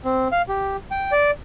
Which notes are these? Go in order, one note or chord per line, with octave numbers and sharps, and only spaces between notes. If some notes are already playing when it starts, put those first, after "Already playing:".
C4
F5
G4
G5
D5